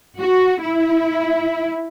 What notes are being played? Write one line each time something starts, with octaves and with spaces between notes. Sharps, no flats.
F#4
E4